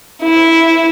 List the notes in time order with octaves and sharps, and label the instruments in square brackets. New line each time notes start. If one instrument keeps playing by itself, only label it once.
[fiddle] E4